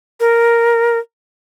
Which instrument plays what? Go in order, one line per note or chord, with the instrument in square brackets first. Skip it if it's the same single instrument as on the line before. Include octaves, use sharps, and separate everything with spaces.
[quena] A#4